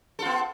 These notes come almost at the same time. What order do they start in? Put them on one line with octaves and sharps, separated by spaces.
A4 F4 B3